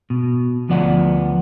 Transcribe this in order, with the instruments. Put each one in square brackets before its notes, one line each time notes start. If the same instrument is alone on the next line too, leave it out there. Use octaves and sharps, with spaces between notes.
[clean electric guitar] B2
D2 F3 B3 D5 F#5